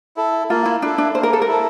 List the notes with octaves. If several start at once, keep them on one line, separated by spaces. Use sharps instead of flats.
E4 A4
A#3 F4
E4
D4 E4 A4
D4
A#3 C5
A#4
A4
A#4
E4 A4